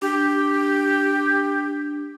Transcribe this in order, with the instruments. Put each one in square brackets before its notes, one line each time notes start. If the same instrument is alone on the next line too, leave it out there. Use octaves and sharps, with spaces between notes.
[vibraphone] D4 [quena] G4